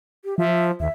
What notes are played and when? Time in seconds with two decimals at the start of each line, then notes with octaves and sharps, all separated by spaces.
0.25 G4
0.38 F3 E5
0.80 D#2 E5